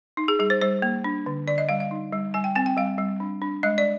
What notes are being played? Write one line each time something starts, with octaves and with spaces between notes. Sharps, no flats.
D#4
G#4
G3 G#4
C5
G3 C5
A#3
D4
D3
D3 D5
D#5
G3 F5
F5
D#4
G3
G3 G#5
G5
C4 G#5
G5
G3 F5
G3
D4
D4
G#3 D#5
D5